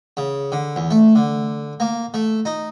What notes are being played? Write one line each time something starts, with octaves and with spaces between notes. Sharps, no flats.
C#3
D3
E2
A3
D3
A#3
A3
D#4